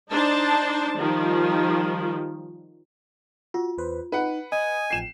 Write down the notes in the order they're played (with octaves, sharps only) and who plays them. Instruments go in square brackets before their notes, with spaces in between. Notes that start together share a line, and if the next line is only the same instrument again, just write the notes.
[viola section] D4 D#4 C5 A5
D#3 F3 G3
[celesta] F4 [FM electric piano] F#4
[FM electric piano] E2 B4 C5
[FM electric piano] D#4 [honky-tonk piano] B4 F#5
[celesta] D#5 [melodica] G#5 [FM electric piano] D#6
[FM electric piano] A1 F3 G5 [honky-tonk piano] C7 E7